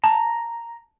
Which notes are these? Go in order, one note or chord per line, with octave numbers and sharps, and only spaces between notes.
A5 A#5